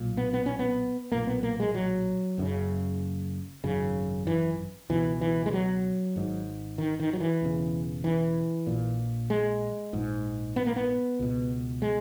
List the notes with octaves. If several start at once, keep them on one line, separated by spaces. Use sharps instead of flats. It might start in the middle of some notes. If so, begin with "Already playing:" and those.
Already playing: B1 A#2
B3
B3
C#4
B3
B1 A#2 A#3
B3
A#3
G#3
F#3
F#1 F#2 C#3
G#1 F#2 C#3
E3
C#2 B2 E3
E3
G#3
F#3
G#1 G#2
D#3
D#3
F#3
E3
E1 E2 C#3
E3
A#1 A#2
G#3
A#1 G#2
B3
A#3
B3
C#2 B2
G#3